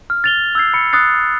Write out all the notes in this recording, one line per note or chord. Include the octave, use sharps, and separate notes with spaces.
F6
A6 F7 G7
E6 G6 G#6 C7
B5 C#7
D#6 F#6 A6 C7